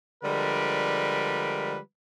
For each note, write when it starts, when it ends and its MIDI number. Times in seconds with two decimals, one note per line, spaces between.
0.24 1.78 50
0.24 1.78 53
0.24 1.78 55
0.24 1.78 56
0.24 1.78 70
0.24 1.78 71